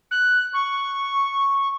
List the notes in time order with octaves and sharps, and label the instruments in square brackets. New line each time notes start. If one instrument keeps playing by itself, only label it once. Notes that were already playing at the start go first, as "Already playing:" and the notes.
[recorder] F#6
C#6